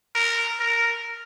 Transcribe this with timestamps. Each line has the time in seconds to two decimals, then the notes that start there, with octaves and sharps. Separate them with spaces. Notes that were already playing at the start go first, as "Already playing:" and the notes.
0.15 A#4
0.60 A#4